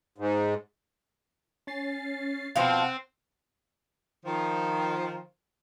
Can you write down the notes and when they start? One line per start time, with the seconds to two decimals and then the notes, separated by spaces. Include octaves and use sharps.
0.18 G#2
1.67 C#4 A6 C7
2.56 B2 F3 C4 F5 F#5
4.25 D#3 F3